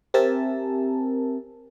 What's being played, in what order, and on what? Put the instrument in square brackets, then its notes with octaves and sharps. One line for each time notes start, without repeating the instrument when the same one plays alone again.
[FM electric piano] C4 G4 A#4 E5 G#5 A5